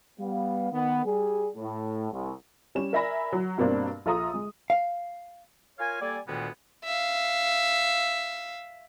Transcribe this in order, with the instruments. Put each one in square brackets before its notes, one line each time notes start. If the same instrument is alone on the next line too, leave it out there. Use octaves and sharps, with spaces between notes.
[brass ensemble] G3 B3 F5
D#3 B3
G3 G#4
A2
C2
[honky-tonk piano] G3 C#4 E7
A#4 D5 E5 G#5 B5 A#6
F#3
G2 B2 A#3 C4 D4
A#1 F4 A4 A#5 D#6
G#3
[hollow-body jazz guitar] F5
[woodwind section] F4 A#4 C#5 F5 G#5
G3 A#3 A4 D5 G#5
D2 A#2 D#3 G3 G#3 B3
[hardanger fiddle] E5 F5